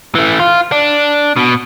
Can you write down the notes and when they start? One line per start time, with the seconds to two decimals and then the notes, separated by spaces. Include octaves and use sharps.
0.15 E3 A3
0.40 F4
0.72 D4
1.36 B2